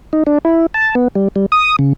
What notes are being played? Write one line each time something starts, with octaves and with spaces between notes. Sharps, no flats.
D#4
D4
E4
A5
B3
G3
G3
D#6
C#3